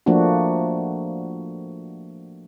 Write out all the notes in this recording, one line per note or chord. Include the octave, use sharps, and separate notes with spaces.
F3 A3 A#3 D4 F#4